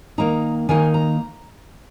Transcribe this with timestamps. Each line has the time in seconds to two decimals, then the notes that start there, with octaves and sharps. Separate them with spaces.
0.18 D#3 A#3 D#4 A#5
0.69 D#3 A#3 D#4 G#5
0.94 A#5